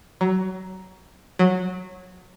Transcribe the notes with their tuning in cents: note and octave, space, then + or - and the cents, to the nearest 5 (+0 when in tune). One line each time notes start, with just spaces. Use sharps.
F#3 +20
F#3 -15